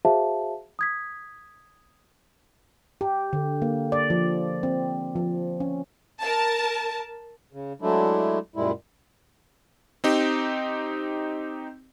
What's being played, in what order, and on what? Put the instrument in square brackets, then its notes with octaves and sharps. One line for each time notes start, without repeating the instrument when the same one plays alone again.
[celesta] F#4 G#4 C5 E5 F5 A5
D#6 G#6 B6
[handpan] G4
D3
A#3
D5
F3
C4
F3
C#4
[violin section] A#4 A5
[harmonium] C#3
F#3 G#3 A3 D4 E4
F#2 A#2 G3 G#3 E4
[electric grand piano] C4 D#4 G4